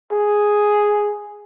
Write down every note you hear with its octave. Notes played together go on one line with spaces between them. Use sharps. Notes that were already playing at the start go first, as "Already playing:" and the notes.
G#4